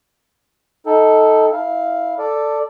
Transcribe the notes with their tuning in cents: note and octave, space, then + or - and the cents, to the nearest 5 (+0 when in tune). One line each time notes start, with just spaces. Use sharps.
D#4 +20 A4 +0 G5 +0
E4 -20 F5 +0
A4 +10 D5 +0